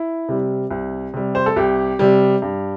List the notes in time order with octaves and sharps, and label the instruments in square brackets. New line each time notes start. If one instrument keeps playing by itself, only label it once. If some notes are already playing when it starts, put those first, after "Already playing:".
Already playing: [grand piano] E4
C3 G3
C2
C3 G3
C5
A4
C2 G4
C3 G3
G2